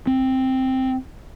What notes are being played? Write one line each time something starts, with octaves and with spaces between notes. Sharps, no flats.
C4